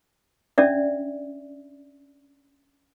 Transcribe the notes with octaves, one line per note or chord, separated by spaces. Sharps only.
C#4 D4 D5 E5